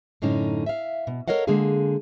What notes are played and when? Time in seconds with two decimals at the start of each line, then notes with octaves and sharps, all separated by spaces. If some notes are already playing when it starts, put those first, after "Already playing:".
0.22 F#2 A2 D3 C#4 D#4
0.66 E5 F5
1.07 B2
1.28 A4 A#4 C#5 D#5 F5 F#5
1.47 D3 G#3 A#3 G#4 F5